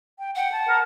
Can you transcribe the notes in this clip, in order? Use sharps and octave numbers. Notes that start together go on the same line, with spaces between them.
G5
F#5 G5
A5
A#4